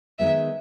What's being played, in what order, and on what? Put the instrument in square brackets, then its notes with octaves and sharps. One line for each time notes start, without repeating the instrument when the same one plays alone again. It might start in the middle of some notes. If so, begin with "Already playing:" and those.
[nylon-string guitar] D#3 G#3 B3 [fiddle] E5